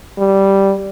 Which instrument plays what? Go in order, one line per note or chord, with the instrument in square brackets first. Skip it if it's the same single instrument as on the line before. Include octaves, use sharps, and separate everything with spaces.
[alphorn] G3